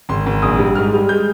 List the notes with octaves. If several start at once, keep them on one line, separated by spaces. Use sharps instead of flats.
G#1 C6
G#1
A#1 D#6
G3
G#2 F6
G3
G#3 G6